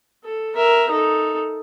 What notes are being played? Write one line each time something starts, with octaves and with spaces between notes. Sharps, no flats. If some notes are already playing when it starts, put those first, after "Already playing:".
A4
A#4 E5
D#4 A4